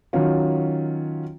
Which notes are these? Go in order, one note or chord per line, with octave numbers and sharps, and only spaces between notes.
D#3 F#3 C#4 F4